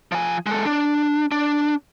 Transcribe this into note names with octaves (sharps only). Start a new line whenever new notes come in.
F3 G#5
G#3 A4
D4
D4